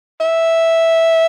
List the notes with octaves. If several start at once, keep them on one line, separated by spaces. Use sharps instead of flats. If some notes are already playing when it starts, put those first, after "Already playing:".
E5